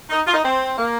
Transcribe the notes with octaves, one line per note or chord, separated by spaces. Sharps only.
D#4
F4
D#4
C4
A#3